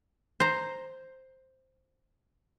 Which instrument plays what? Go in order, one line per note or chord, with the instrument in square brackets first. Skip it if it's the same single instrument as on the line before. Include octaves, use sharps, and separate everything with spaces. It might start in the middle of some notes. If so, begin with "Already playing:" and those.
[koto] C5 A#5